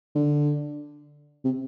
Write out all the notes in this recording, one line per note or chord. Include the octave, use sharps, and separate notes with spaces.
D3
C3